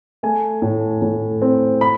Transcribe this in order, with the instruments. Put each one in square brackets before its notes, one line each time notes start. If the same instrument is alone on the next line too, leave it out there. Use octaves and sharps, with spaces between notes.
[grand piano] A3 G#5
A2
A2
C4
B5